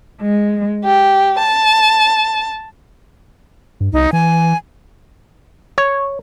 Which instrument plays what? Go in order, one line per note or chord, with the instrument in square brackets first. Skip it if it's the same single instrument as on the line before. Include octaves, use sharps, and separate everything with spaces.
[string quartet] G#3
G4
A5
[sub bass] G2
[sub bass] C2 [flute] D#4
[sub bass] E3 [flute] G#5
[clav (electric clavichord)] C#5